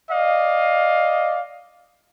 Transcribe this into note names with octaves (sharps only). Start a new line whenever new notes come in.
D5 D#5 F5